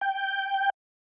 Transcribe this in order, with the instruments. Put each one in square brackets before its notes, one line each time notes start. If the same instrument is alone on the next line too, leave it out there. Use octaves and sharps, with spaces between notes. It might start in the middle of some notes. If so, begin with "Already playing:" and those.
[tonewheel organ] G5